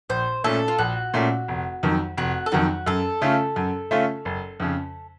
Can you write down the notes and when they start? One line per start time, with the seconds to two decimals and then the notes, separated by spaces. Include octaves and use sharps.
0.09 A#1 C5
0.44 A#2 A3 C#4 A4
0.68 F4
0.79 A#1 F#4
1.14 A#2 A3 C#4
1.48 F1
1.83 F2 D#3 F#3
2.17 F1 F#4
2.46 A4
2.52 F2 D#3 F#3 F#4
2.86 F#2 A4
3.22 C#3 A3 C#4 F4
3.56 F#2
3.91 C#3 A3 C#4 F4
4.25 F#1
4.60 F2 C#3